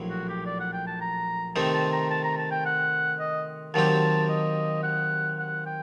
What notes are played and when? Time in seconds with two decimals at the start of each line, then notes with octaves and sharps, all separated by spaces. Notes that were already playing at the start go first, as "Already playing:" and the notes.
Already playing: A#1 A2 F#3
0.09 F#4
0.28 G4
0.46 D5
0.60 F#5
0.73 G5
0.87 A5
1.01 A#5
1.56 C3 D#3 A3 C4 D#4 A5
1.74 A5
1.93 A#5
2.11 A5
2.24 A#5
2.38 A5
2.51 G5
2.65 F#5
3.20 D#5
3.74 D#2 D#3 F#3 C4 G4 A5
4.29 D#5
4.83 F#5
5.38 F#5
5.66 G5